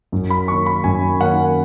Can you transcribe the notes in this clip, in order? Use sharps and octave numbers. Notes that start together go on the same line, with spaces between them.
F#2
B5
D#3 A#3 C#4 C#6
B5
F#2 G#5
D#3 A#3 C#4 F#5